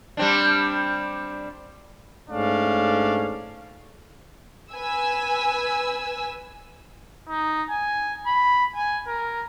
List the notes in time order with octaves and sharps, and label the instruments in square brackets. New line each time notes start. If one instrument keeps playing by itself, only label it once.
[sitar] G3 C4 D4
[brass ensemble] G#2 A3 C#4 D4 F5
[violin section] B4 G#5 E6
[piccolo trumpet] D#4
G#5
B5
G#5
A#4